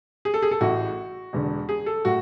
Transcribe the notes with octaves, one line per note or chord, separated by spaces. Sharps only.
G#4
A4
G#4
A4
A1 A2 E3 F#4
E1 E2 D3
G#4
A4
A2 F#4